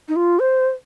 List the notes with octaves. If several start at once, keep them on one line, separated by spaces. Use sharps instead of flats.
D#4
F4
C5